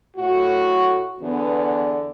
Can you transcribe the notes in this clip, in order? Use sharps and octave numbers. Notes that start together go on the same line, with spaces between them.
A2 A3 F#4
E2 D3 B3 D4